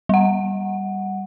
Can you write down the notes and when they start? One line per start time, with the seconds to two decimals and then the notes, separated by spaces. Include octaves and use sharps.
0.09 G3 F#5